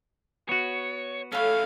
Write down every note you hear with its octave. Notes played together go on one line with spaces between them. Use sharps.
B3 F#4 C#5
A3 C#4 A4 B4 C#5 F5